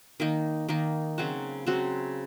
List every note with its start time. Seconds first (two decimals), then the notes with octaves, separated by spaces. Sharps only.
0.20 D#3 A#3 D#4
0.69 D#3 A#3 D#4
1.18 C#3 F#3 C4 F#4
1.67 C#3 F#3 C4 F#4